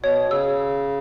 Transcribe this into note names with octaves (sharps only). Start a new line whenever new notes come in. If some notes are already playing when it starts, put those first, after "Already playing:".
B2 C#5
C#3 E6